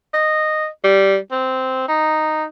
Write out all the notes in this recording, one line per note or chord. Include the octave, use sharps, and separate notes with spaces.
D#5
G3
C4
D#4